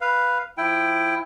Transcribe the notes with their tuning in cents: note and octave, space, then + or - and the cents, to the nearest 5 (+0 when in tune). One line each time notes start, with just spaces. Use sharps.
B4 +0 F5 +0
F3 +0 E4 +15 G5 +0